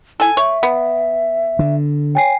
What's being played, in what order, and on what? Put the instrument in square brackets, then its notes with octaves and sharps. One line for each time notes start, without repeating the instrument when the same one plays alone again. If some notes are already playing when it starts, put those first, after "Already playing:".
[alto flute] E4 [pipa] A4 G#5
[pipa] C#5 [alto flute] E5
[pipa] B3
[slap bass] D3
[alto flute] C#5 [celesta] G5 G#5 C7